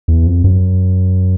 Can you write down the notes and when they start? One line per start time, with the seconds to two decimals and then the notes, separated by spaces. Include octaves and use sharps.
0.08 E2
0.26 F2
0.44 F#2